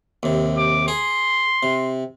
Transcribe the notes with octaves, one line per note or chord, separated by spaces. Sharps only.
D#2 C3
D6
G#4 C6
C3